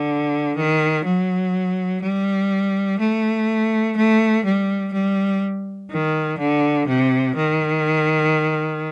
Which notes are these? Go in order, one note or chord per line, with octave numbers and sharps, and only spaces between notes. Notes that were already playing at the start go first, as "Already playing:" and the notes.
Already playing: D3
D#3
F#3
G3
A3
A3
G3
G3
D#3
D3
C3
D#3